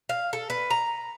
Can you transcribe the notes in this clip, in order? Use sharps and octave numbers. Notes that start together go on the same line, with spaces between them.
F5
A4
B4
A#5